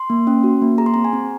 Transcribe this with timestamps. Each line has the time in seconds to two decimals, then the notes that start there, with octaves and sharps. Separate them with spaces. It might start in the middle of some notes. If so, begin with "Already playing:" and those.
Already playing: C6
0.10 A#3
0.27 C#4
0.44 F#4
0.62 A#3
0.78 G#4 A#5
0.86 C6
0.94 C4 A#5
1.05 G#5
1.13 C4